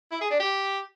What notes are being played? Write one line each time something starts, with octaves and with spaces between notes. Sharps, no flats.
E4
G#4
D4
G4